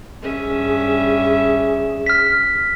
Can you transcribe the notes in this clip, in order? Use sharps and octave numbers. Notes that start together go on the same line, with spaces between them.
G2 C#4 G#4 E5
F6 B6